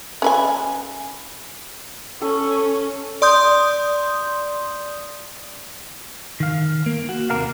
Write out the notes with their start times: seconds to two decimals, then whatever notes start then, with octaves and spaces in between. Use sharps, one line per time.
0.22 C#4 B4 G#5
2.22 C#4 A4
3.22 D5 C6 D#6 G6
6.40 D#3 F5
6.86 A#3
7.09 F#4
7.30 D#2 C3 A#3 A#4 F5